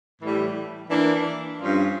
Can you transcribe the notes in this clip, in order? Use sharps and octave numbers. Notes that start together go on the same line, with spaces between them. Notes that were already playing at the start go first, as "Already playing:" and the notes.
A2 E3 G3
E3 A#3 D4
G2 F3 C#4 F4